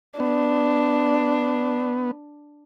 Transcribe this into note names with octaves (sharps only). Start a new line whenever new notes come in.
B3 D4